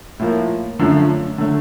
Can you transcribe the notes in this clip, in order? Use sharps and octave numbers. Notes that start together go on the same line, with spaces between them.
A2 F3 A#3
F#2 D3 F3 A3
D3 F#3 A3